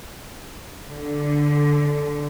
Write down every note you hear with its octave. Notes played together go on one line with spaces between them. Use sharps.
D3